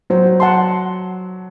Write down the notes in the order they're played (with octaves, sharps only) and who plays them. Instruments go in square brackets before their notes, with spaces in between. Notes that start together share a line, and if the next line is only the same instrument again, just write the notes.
[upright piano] F#3 [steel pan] C5
[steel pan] F#5 A5 C6